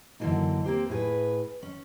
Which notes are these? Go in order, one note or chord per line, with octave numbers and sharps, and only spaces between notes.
F#2 D3 E3 F#3 A#3 D#4
A#3 C4 G4 C5
A2 G#4 B4
C#4